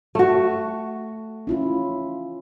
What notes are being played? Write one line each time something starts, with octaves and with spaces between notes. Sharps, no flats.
A3 F#4
C#4 E4 F4